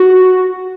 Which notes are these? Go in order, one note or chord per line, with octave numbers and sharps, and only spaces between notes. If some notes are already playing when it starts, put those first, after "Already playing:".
Already playing: F#4